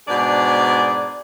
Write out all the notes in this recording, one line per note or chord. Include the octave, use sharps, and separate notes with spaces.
G#2 B2 D4 G#4 D5